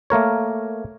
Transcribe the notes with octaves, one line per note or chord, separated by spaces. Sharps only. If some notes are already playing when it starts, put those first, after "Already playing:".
A3 A#3 A#4 C#5